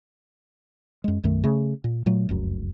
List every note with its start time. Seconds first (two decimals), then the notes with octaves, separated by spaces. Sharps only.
1.04 F#2 G#3
1.24 B1 F#2 D#3 A3
1.44 C#3 A3
1.84 A#2
2.06 A#2 F#3 A3
2.29 F1 C#2 F#2